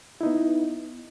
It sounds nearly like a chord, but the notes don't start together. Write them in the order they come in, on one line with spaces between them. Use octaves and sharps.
E4 D#4 B3